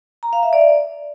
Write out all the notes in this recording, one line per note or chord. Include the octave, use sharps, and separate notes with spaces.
A#5
F5
E5
D5